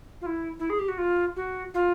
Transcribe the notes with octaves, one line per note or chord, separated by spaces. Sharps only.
F4
E4
E4
G#4
G4
F#4
F4
F#4
F4